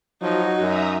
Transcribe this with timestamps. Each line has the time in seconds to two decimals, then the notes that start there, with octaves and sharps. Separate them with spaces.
0.22 F3 F#3 D#4 F#4
0.61 F#2 E5 A#5 D#6